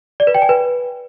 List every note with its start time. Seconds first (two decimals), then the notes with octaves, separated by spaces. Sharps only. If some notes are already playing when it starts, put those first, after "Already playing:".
0.20 D5
0.27 B4
0.34 G5
0.42 G#5
0.49 B4